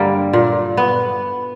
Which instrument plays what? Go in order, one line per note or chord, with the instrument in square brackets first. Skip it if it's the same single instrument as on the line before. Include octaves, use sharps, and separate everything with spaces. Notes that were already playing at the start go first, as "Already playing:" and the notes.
Already playing: [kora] G2 D3 G3 A#3
A#2
B3